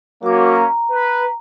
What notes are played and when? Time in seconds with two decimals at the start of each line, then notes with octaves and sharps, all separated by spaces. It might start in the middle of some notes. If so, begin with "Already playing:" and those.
0.23 F#3 A#3 C#4 F#4 D6
0.56 A#5
0.91 B4